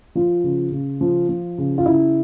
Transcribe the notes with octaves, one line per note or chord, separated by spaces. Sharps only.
F3 F4
C#3
C#3
F3
F3
C#3
F4
C#3 E4